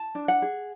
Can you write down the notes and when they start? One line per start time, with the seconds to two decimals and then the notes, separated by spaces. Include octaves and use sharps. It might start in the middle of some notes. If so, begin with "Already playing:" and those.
Already playing: A5
0.15 D4
0.28 F#5
0.42 G#4